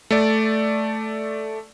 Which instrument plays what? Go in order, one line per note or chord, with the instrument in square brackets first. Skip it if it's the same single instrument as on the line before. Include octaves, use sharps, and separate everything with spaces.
[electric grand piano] A3 D5